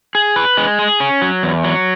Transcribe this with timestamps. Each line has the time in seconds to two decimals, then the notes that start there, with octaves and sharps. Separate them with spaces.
0.15 G#4
0.36 B4
0.57 G#3
0.79 G#4
1.00 C#4
1.22 F#3
1.43 E2
1.64 F#3